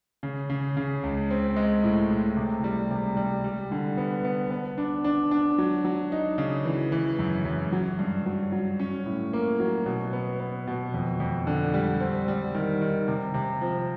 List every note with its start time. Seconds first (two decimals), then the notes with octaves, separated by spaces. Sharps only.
0.23 C#3
0.50 C#3
0.77 C#3
1.03 C#2
1.31 C4
1.56 G#3
1.84 A2
2.10 A2
2.37 C3
2.64 G3
2.91 C3
3.17 G3
3.44 G3
3.71 D3
3.98 B3
4.25 B3
4.51 B3
4.78 D4
5.04 D4
5.31 D4
5.58 F#3
5.85 F#3
6.12 D#4
6.38 C#3
6.65 E3
6.92 E3
7.19 F#2
7.45 F#2
7.72 F#3
7.99 G2
8.26 F#3
8.52 F#3
8.80 C#4
9.06 A2
9.33 A#3
9.60 F#3
9.86 B2
10.13 B3
10.40 B3
10.67 B2
10.94 F2
11.20 F2
11.47 D3
11.74 G3
12.00 C4
12.28 G3
12.54 D#3
12.81 D#3
13.08 C3
13.34 C3
13.61 F3